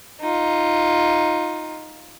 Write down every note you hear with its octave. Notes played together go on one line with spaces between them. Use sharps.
D#4 F4